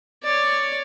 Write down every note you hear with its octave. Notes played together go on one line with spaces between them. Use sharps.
C#5 D5